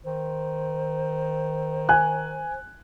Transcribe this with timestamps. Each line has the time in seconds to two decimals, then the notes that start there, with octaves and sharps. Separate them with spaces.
0.05 D#3 C5
1.89 G#5 F#6